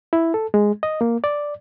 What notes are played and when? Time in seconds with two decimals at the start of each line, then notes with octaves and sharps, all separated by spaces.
0.13 E4
0.34 A4
0.54 G#3
0.83 D#5
1.01 A#3
1.24 D5